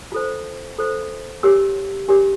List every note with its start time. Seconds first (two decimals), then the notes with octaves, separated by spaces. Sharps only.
0.12 F4 A4 C5
0.78 F4 A4 C5
1.43 D4 G4 A#4 C#5 E6
2.08 D4 G4 A#4 C#5